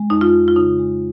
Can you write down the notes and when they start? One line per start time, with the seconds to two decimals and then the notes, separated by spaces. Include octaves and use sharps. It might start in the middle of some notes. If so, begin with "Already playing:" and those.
Already playing: G#3
0.10 F2 D#4
0.21 F4
0.33 F2
0.48 F4
0.56 C#3 D#4
0.79 G#3